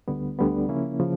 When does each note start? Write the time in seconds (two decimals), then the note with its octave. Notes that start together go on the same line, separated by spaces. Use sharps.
0.08 D2 D3 G3 B3
0.39 D2 D3 G3 B3
0.69 C#3 F3 A#3 C#4 E4
1.00 C#3 F3